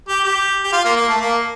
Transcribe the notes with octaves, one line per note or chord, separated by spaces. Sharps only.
G4
G4
G4
F4
A#3
A#3
A3
A#3